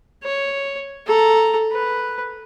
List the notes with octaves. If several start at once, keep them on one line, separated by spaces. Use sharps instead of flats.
C#5
A4 A#5
B4